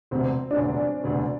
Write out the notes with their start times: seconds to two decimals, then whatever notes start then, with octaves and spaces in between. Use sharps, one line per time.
0.11 E1 D2 C3 C4
0.51 D4
0.57 E1 D2 C3 C#4
1.04 E1 D2 C3